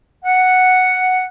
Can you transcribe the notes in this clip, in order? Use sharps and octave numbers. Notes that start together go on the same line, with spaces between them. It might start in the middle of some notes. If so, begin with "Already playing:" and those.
F#5